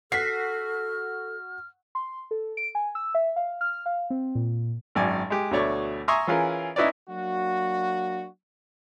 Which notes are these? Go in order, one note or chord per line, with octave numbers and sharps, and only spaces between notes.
F#4 A4 F6 B6 C7
C6
A4
D7
G#5
E6
E5
F5
F6
F5
C4
A#2
G#1 F#2 D5 G#5
G#3 G4
D2 B2 A3 C#5 D5 C#6
E5 G#5 A#5 C6 C#6 D#6
E3 C#4 F4 G#4 A#4
C#4 D#4 E4 B4 C#5 D5
F#3 A#3 D4 F#4